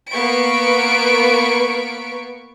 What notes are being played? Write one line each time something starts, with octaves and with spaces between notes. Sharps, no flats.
A#3 B3 C#6 B6 D7